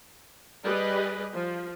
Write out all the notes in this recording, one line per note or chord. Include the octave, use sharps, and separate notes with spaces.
G3 G4 G#4 B4 D5 D#5
F3